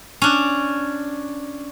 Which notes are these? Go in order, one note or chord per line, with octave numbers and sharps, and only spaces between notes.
C#4 D4